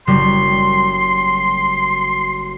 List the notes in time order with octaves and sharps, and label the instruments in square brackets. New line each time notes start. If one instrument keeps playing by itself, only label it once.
[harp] F#1 G3 [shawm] C6